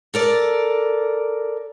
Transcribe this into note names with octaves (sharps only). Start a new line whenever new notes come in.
A4 A#4 D5